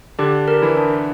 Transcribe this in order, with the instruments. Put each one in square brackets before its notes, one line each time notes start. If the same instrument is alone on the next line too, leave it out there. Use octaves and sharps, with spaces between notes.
[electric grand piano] D3 D4 [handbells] G4
[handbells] A#4
[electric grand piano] E3 E4
[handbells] D4